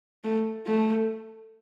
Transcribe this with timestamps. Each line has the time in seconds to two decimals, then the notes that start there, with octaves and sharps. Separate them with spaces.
0.24 A3
0.67 A3